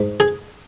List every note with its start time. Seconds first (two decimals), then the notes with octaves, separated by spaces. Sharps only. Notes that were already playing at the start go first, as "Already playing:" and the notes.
Already playing: G#2
0.20 G#4